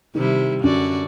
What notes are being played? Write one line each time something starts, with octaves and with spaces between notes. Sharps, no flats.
C3 D#3 G3 E4
F#2 D3 F#4 D5